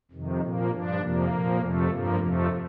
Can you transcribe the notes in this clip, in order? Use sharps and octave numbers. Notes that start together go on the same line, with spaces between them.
F2 C3 D#3
A#2 F3 A#3
G2 F3 D4
F2 C3 F3 A#3
A#2 F3
F2 C3 F3 A3
G2 F3 A#3
F2 C3 F3 A3